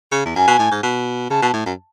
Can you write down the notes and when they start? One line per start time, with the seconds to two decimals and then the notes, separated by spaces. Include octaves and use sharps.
0.12 C#3
0.26 E2
0.36 F#2 G#5
0.47 B2
0.59 A2
0.71 G#2
0.83 B2
1.30 C#3 A5
1.42 B2
1.53 A2
1.66 F#2